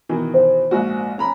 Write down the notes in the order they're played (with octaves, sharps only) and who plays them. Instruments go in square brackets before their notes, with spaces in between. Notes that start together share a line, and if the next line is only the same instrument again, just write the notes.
[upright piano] B2 D#3 E3
[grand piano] C5
[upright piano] A#1 G#2 F#4
C#4 A#5 B5